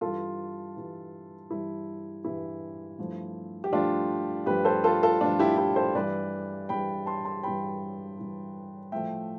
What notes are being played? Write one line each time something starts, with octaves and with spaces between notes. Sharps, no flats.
G2 E3 G3 F4 A4
G2 E3 G3
G2 E3 G3 E4
G2 E3 G3 E4
G2 F3 A3
G4
G2 F3 A3 D4 F4
G2 F3 A3 G4 B4
A4 C5
F4 A4
F4 A4
G2 F3 A3 D4 F4
E4 G4
E4 G4
A4 C5
G2 E3 G3 B4 D5
G2 E3 G3 G5 B5
A5 C6
A5 C6
G2 E3 G3 G5 B5
G2 E3 G3
A2 F3 A3 E5 G5